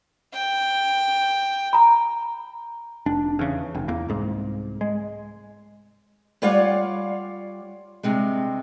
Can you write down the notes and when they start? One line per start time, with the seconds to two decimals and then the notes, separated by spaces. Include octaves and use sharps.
0.33 G5
1.73 A#5 B5
3.06 F1 D4
3.39 E2 C#3
3.75 F1
3.88 E2 A#3
4.09 C2 G#2
4.81 G#3
6.42 G3 F4 C#5 D5 F5 F#5
8.03 G2 C3 G#3